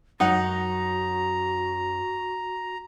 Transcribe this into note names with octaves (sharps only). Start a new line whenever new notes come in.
F#2 D#4 F#4 F#5 A#5